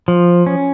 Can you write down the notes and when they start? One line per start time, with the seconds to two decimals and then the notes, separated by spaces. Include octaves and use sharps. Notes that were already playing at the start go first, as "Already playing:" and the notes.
0.08 F3
0.46 C#4